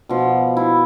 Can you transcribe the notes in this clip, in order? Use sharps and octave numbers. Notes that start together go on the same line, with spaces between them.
B2 F3
E4